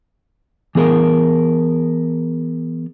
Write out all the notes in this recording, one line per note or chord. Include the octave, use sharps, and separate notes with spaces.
E3 B3 G#4 A#4